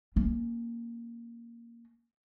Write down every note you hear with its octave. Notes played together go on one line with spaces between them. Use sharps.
A#3 C#4